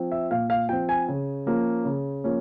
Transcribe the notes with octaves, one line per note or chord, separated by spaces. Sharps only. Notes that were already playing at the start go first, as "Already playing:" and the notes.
Already playing: F3 C4
E5
A#2 F5
F5
F3 C4 G5
G#5
C#3
F3 A#3 C#4
C#3
F3 A#3 C#4